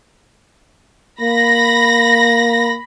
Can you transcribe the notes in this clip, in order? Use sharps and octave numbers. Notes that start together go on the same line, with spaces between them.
A#3 B5 A#6